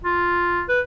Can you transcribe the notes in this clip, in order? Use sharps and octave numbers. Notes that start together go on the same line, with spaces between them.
F4
B4